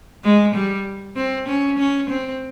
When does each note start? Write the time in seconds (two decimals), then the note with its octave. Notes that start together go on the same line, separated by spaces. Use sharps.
0.24 G#3
0.55 G3
1.16 C4
1.48 C#4
1.79 C#4
2.10 C4